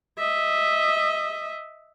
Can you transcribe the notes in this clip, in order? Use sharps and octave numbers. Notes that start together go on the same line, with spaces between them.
D#5 E5